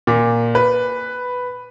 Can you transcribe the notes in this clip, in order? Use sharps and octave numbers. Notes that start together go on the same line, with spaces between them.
A#2
B4